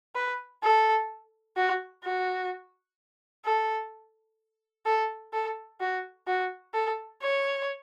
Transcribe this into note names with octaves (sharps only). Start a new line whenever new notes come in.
B4
A4
F#4
F#4
A4
A4
A4
F#4
F#4
A4
C#5